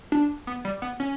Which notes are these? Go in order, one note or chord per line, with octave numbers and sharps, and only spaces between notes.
D4
B3
G3
B3
C#4